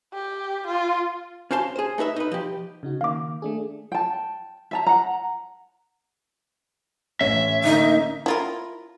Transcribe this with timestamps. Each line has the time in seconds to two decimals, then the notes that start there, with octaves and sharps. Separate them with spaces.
0.14 G4
0.67 F4
1.51 C#4 F#4 C5 F5 A5 C6
1.76 G#4 C5
1.98 A3 D#4 B4 E5
2.16 D#4 B4
2.32 F3 G4
2.83 C#3 D#4 F#4
3.01 D#3 A#3 F5 D6
3.42 A3 D4 G#4
3.92 G5 A5
4.71 E5 A5 A#5
4.86 F#5 A#5
7.21 A1 C#4 E5
7.64 D3 A#3 D#4
8.26 E4 F4 A#4